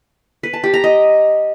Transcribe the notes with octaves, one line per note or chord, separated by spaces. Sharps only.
B4
A5
G4
A#5
D#5